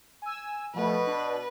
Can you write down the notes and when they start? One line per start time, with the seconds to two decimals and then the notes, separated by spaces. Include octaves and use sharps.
0.22 G#5 E6
0.75 B2 F3 A3 B4
1.07 D4